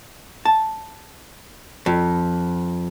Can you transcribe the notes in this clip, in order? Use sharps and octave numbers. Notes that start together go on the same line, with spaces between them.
A5
F2